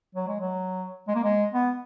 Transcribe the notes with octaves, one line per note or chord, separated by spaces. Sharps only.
F#3
G#3
F#3
G#3
A#3
G#3
B3